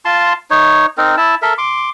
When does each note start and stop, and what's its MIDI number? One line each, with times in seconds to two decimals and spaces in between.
0.05 0.33 65
0.05 0.33 81
0.05 0.33 84
0.50 0.86 63
0.50 0.86 73
0.98 1.16 60
0.98 1.16 63
0.98 1.16 70
1.17 1.35 64
1.17 1.35 81
1.42 1.53 69
1.42 1.53 70
1.42 1.53 76
1.58 1.90 84
1.58 1.90 86